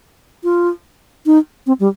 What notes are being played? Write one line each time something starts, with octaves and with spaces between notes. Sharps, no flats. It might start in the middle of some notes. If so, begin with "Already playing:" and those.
F4
D#4
C4
G3